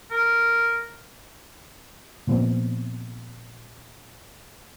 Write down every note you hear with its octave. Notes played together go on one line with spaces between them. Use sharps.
A#4
A#2 F3 B3 C4